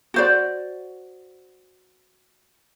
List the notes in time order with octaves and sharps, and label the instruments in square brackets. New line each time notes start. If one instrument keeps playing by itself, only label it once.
[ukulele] F#4 C5 D5